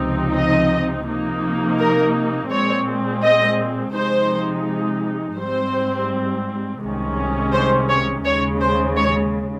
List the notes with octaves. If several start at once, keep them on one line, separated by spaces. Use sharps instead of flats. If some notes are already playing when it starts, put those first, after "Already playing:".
Already playing: C#2 C3 F3 C4 D#4
D#5
C3 F3 A#3 D#4
A#4
A#2 G#3 C4 C#5
D#5
C3 F3 G#3 D#4 C5
G#2 G3 C4 C5
C2 C3 D#3 G#3 C#4
C5
C#5
D#2 C#3 G#3 C#5
C5
C#5